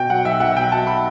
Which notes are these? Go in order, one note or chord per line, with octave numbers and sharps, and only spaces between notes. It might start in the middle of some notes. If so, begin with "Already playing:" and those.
Already playing: B2 G5
F#3 F#5
B1 E5
B1 F#5
B2 G5
F#3 A5
B5